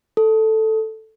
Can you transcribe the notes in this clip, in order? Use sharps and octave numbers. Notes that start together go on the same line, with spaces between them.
A4